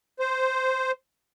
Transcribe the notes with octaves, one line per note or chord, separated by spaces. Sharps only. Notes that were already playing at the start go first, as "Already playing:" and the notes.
C5